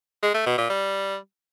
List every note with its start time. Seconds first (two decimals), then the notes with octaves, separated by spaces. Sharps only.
0.23 G#3
0.34 A3
0.46 B2
0.58 A#2
0.70 G3